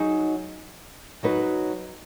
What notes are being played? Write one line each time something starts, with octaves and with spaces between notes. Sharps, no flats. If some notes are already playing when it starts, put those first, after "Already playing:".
Already playing: F#3 D#4 G#4
F#3 D#4 F#4 B4